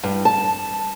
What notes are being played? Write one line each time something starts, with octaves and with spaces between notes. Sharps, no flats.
G2
A5